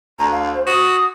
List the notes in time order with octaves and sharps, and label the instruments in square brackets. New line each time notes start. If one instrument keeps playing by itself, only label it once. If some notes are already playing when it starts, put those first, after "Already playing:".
[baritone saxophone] D2 [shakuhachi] A#5
[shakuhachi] F5
C5
[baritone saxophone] F#4 [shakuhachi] D#6